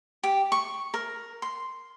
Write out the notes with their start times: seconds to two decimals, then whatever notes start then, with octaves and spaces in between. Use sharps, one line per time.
0.24 G4
0.52 C#6
0.94 A#4
1.42 C6